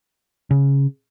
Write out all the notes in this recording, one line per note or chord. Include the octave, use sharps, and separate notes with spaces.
C#3